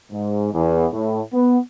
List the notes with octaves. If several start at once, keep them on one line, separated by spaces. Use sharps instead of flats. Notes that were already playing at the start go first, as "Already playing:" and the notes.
G#2
E2
A2
B3